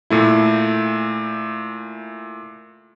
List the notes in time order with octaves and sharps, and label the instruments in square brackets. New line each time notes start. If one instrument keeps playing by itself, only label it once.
[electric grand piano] A#2 A3 E4